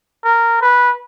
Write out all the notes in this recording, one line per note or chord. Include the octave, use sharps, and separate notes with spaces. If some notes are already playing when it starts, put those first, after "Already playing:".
A#4
B4